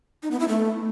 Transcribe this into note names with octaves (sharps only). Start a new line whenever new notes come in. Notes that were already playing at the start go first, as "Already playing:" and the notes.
D#4
B3
E4
A3